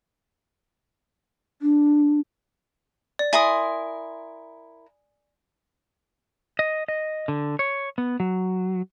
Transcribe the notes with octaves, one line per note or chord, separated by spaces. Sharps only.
D4
D5
E4 A#4 G#5 C6 D#6
D#5
D#5
D3
C#5
B3
F#3